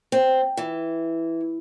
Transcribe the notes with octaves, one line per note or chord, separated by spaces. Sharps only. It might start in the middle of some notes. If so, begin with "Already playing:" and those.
C4
E3